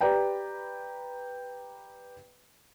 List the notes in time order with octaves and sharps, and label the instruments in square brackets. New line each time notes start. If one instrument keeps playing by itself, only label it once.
[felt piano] G4 B4 D5 G5 A#5